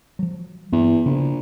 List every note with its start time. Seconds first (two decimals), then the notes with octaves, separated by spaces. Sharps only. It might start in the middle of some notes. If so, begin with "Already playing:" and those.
0.19 F3 F#3
0.72 E2 G2 A#3 B3
1.06 A#1 C#3